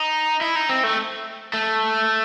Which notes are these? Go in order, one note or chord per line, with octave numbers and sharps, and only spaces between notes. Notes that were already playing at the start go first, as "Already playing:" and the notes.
Already playing: D#4
E4
D#4
C4
A3
A3